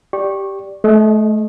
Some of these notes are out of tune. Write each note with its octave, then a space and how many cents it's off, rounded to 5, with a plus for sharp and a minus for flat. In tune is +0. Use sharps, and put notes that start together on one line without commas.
G4 +0 D5 +0 C#6 -20
A3 -30 G#4 +40 D#5 +0